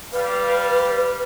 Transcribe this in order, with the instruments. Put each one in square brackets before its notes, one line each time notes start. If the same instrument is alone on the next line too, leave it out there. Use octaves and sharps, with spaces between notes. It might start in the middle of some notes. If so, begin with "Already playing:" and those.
[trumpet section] G3 F5 [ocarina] B4